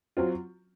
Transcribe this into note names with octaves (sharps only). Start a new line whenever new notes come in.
F#3 C4 F4